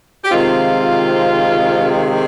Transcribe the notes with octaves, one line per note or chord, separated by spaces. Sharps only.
G4
C3 D#3 G#3 C4 F4